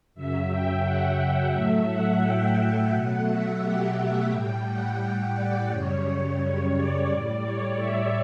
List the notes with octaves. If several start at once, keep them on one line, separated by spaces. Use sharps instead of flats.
F#2 C#3 F#3 E5
G5
F#5
A2 F#3 A3 E5
F#5
G5
F#5
B2 F#3 A3 F#5
E5
G4
F#5
A2 G3 G5
F#5
G5
D5
F#2 C#3 G3 C#5
D5
A2 G3
C#5
E5